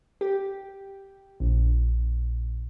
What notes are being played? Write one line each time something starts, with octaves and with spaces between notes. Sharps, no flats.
G4
A#1